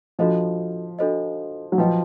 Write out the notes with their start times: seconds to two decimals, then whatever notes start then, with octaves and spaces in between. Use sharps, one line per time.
0.19 F3 D4 F#4 A4 C5 D#5
0.99 D4 F#4 A4 C5 D#5
1.72 F#3
1.78 F3 F#4 B4 D#5 G5